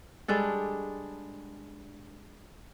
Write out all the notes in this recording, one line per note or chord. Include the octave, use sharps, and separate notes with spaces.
G3 G#3 D4 A4